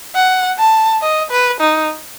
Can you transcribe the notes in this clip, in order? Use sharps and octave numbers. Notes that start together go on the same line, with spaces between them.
F#5
A5
D#5
B4
D#4